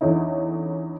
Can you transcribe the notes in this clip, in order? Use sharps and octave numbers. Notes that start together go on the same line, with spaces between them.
E2 D3 C#4 D#4 E4